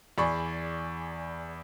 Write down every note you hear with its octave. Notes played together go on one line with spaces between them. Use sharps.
E2 G#4 D5 B5 C#6